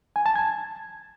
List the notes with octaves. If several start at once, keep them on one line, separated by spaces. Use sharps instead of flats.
G#5
A5
G#6